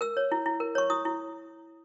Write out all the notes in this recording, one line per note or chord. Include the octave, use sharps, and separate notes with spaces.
A#4 E6
C#5
E4
E4
A#4
C#5 C#6
E4 D#6
E4